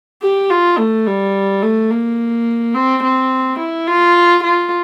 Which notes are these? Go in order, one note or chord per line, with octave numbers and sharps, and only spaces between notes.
G4
F4
A3
G3
A3
A#3
C4
C4
E4
F4
F4